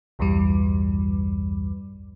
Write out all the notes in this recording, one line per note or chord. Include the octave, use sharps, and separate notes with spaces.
B1 E2 G2 E3 G3